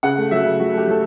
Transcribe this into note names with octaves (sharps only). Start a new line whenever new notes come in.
C#3 F#5
A3
F#3 E5
C#3
F#3 F#4
A3 G4
F#3 A4